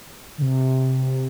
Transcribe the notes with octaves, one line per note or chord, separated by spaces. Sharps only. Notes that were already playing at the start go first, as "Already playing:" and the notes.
D3
C3